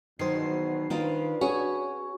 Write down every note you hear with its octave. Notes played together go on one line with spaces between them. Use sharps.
E2 B2 D#3 F#3 C5 C7
D#3 D4 F4 A#4 B4
C#4 F#4 G#4 C#5